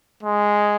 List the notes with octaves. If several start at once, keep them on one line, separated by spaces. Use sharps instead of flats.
G#3